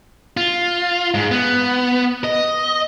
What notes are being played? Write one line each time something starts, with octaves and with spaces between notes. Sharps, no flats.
F4
G#2
B3
D#5